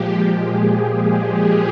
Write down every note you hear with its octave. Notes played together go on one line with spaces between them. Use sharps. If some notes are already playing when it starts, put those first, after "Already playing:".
Already playing: A#2 F3 G#3 G4
G#4
G4